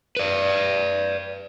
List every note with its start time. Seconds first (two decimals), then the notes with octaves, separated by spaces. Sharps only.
0.17 B4 D5